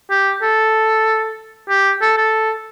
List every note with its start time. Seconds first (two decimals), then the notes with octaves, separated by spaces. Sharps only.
0.10 G4
0.42 A4
1.69 G4
2.02 A4
2.17 A4